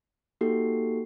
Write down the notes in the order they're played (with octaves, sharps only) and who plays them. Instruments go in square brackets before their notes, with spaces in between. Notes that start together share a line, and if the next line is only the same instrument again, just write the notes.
[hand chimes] A#3 D#4 F#4 G4 A4 C7